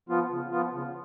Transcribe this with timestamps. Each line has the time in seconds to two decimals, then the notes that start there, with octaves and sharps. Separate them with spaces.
0.09 F3 B3 F4
0.30 C#3
0.51 F3 B3 F4
0.73 C#3